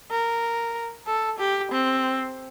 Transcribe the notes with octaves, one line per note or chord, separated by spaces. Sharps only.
A#4
A4
G4
C4